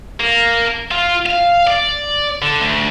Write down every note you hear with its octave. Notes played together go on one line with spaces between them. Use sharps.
A#3
F4
F5
D5
D3
D2